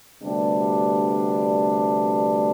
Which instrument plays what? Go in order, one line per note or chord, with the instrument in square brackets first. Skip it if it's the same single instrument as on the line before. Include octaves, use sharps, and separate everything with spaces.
[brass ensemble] D2 C3 G3 B3 D4